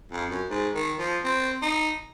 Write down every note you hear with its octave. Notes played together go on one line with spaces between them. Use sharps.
F2
F#2
G#2
D#3
F3
C4
D#4